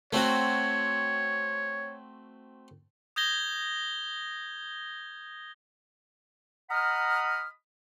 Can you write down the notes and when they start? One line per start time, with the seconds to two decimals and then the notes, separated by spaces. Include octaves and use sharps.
0.13 A3 C4 F#4 C#5
3.16 D#6 G6 G#6 A#6 G7
6.70 D#5 F#5 A#5 B5 D#6 F6